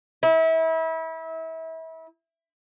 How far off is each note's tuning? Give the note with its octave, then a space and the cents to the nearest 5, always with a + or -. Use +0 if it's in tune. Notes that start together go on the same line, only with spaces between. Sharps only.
E4 -30